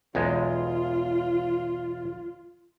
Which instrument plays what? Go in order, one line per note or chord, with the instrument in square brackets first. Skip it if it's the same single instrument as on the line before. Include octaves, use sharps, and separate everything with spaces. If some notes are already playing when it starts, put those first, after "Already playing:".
[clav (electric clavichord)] B1 E2 G#3 [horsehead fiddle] F4